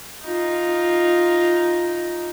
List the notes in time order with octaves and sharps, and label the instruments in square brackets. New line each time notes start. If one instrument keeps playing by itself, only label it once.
[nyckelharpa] D#4 F4